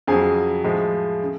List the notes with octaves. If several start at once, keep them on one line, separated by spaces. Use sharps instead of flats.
F2 C#3 F#3 G#4 G#5
A2 F3 G#3
C#3